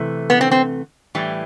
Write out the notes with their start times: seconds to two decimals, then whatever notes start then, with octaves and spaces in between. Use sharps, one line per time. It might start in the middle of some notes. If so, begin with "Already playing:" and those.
Already playing: C3 E3 A3
0.30 B3
0.41 C4
0.51 C4
1.15 A2 E3 G3